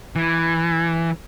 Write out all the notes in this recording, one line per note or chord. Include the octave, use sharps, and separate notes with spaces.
E3